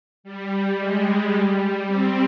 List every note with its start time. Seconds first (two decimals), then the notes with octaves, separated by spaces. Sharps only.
0.24 G3
0.78 G#3
1.33 G3
1.87 C4